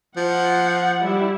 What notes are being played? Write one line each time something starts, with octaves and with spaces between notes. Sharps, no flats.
F3 F#5
G3 E4